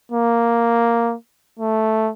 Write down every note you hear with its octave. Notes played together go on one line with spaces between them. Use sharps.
A#3
A3